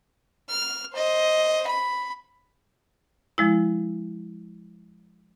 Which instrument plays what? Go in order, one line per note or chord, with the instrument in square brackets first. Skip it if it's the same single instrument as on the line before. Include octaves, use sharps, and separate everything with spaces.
[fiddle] F6
C5 D#5
B5
[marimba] F3 G#3 E4